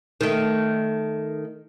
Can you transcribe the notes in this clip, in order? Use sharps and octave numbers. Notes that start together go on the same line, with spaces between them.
D#3 A3